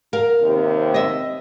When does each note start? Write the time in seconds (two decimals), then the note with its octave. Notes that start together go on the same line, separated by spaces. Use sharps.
0.13 A#4 F5
0.42 D#2 C3 C4
0.94 D#5 E5